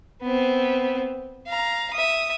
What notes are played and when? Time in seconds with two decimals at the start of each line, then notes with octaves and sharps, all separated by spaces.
0.22 B3 C4
1.47 F5 A#5
1.94 E5 D#6